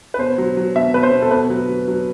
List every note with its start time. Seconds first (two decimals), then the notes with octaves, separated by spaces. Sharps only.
0.14 B4
0.18 B2 C5
0.38 F#3
0.57 F#3
0.75 B2 E5
0.94 B2 B4
1.03 C5
1.12 B2
1.22 A4
1.31 B2 B4
1.50 F#3
1.68 F#3
1.88 F#3